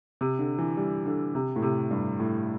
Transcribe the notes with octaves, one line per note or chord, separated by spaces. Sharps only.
C3
D3
E3
G3
D3
C3
A2
C3
G2
A2